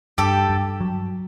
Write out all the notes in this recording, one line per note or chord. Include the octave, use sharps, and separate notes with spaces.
G2 G4 A4
G2
F#3